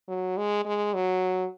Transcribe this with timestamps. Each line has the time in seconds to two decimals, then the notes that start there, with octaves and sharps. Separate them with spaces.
0.08 F#3
0.37 G#3
0.65 G#3
0.94 F#3